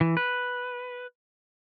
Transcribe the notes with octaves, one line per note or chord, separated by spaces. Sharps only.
E3
B4